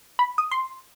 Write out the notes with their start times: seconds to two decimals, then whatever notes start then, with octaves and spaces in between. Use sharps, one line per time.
0.19 B5
0.38 D#6
0.51 C6